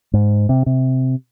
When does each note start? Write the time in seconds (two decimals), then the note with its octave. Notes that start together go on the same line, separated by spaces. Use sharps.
0.13 G#2
0.49 C3
0.66 C3